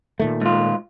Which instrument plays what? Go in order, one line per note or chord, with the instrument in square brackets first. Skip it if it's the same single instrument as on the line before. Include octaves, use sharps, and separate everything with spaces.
[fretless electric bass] A#2 D#3 A3
[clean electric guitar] G#2 F4